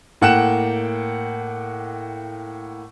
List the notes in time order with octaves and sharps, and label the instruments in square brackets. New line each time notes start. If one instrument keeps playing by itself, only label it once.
[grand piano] A2 A#3 F#5 G5 F#6 E7